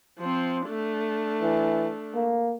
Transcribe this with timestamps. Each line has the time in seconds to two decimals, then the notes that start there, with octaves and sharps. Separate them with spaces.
0.19 F3 C4
0.69 A3 D4
1.42 E3
2.15 A#3